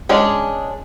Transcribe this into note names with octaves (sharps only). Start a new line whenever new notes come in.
G#3 C#4 D4 G#4 D5